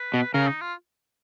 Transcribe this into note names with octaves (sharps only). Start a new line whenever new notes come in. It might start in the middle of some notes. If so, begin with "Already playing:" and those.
Already playing: B4
B2
C#3 A#4
D#4
F4